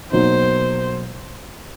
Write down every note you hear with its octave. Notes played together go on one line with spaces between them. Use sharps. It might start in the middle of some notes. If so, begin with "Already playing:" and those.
B2 F#3 A#3 D#4 C5